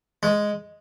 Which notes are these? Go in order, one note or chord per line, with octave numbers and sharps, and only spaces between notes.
G#3